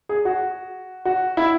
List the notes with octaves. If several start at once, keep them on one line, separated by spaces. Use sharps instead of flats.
G#4
F#4
F#4
E4